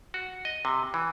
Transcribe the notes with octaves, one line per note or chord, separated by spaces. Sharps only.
F#4
D#5
C3
E3